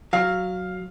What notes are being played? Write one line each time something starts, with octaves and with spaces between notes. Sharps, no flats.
F#3 F5